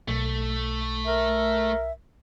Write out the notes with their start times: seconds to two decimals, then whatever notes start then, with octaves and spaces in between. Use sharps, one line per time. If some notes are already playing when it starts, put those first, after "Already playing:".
0.08 B1 A3 B6
1.06 A#4 E5